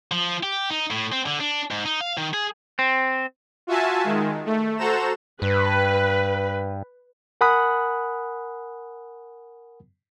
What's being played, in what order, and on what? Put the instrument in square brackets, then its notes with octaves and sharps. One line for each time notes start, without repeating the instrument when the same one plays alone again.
[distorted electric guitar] F3
G4
D#4
A2
C4
D3
D4
G#2
D#4
F5
D#3
G#4
[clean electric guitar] C4
[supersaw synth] F4 F#4 E5 G#5 A5
D#3 G#3
A3
F#4 A4 C5 A#5 E7
[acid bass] G2 [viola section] B4
[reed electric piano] A#4 F#5 G#5 B5 D#6 F#6